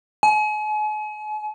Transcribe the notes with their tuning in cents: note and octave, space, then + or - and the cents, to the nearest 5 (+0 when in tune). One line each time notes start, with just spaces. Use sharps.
G#5 +40